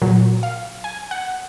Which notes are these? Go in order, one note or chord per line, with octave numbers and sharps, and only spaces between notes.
A#2 F#3
F5
G#5
F#5